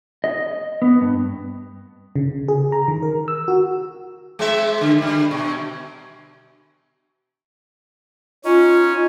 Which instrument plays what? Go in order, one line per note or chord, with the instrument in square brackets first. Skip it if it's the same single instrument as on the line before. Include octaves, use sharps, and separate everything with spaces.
[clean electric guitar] D#5
B3
G2
[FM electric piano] C#3
G#4
A#5
D#3
A#4
E6
F#4
[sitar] G#3 C4 E5
D3
D3 G3
B2
[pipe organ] C#4 [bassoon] D#4 [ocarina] F4